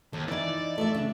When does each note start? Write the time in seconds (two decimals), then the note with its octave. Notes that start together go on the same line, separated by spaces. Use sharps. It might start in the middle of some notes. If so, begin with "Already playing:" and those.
0.13 D#2 A4
0.28 E3 D#4 E4 D5
0.78 A3 A4 D#5 E5
0.94 C#3 D4